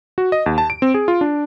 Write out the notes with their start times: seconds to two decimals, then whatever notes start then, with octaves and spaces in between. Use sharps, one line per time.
0.18 F#4
0.32 D#5
0.46 D#2
0.58 A5
0.70 D7
0.82 C4
0.94 G#4
1.08 F4
1.21 D4